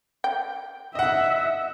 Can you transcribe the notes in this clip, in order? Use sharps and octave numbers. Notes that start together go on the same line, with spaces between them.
G5
D#5 E5 F#5